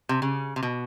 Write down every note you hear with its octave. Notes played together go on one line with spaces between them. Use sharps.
C3
C#3
C3
B2